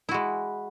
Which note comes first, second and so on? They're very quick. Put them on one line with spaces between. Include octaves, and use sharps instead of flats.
E4 F#4 G#3